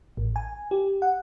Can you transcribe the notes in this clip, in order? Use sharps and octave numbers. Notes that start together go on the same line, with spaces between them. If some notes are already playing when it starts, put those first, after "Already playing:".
A1
G#5
G4
F#5